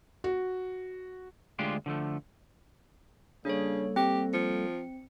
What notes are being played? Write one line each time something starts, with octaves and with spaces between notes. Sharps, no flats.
F#4
D2 G#3 D4 F4 G4
D3 F3 A3
C#3 G3 A#3 D4 A4 C#5
C4 G4 G5
F3 C#7